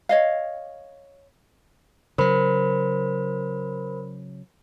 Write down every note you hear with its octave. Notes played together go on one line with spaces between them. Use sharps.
C#5 D#5 F5
C#3 F#3 A#4 C5 B5